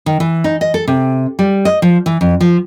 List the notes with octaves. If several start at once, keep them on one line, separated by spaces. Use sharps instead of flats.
D#3
E3
D#4
D#5
A4
C3
G3
D#5
F3
E3
F2
F3